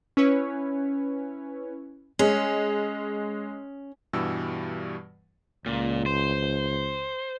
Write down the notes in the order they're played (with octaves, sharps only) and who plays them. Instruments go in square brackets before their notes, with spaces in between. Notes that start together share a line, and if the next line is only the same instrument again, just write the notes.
[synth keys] C#4 E4 B4 C#5
[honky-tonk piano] G#3 [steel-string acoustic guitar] C#4
[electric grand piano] G2 B2 E3 G3 E6
[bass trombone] C#2 [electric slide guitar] A#2
[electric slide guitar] C5